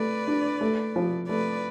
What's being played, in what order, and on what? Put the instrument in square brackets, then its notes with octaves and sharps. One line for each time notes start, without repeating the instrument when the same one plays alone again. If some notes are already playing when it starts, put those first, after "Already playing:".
Already playing: [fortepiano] A3 [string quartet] B4 D5
[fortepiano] D4
A3
F3
[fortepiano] A3 [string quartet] B4 D5